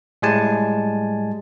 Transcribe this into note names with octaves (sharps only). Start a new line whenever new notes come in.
A2 G3 G#3 G#5 A5